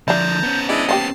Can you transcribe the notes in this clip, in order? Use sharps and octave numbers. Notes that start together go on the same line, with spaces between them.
D3 F3 D4 E4 A5 A#5 G6
B3 C#4
G#3 D4 E4 D5 D#5
A#3 F4 G4 A5 C7